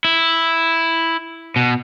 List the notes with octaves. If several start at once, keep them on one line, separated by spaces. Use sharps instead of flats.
E4
B2